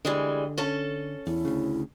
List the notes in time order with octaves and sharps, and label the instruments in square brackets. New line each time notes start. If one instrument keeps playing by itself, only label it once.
[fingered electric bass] D3 [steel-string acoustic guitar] E3 G3 G#3
[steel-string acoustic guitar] C#4 A4 A5
[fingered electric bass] E2 [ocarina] E4
[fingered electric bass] D2 C#3